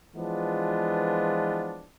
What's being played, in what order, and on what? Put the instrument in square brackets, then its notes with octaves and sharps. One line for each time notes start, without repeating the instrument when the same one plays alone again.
[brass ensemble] E3 F3 G#3 B3 D4 F4